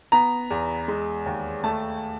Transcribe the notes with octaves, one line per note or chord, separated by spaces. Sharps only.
B3 A#5
E2
G#3
D#2
A3 A5